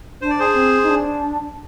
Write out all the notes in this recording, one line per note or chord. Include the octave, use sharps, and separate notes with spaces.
D4 C5
D5
G#4 C5
C4
D#4
D4